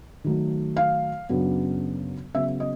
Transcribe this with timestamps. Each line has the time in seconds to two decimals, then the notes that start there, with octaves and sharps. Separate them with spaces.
0.24 D#3 F#3 A3
0.77 F5
1.29 F#2 C#3 F#3 B3 D4
2.34 C#3 F#3 B3 E5
2.60 D#5